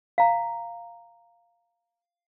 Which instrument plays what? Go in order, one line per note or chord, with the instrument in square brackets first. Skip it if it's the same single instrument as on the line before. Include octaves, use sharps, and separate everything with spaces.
[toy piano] F5 A#5